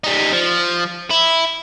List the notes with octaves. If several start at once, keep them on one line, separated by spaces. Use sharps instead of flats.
G3 D#4
F3
E4